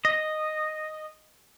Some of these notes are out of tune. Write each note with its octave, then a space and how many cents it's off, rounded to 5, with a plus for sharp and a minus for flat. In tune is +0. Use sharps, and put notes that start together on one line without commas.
D#5 -5